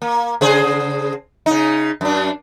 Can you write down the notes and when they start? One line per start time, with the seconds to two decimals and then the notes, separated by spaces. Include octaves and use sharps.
0.02 A#3
0.41 C#3 G#4 C5
1.46 C#3 D#4
2.01 F#2 D4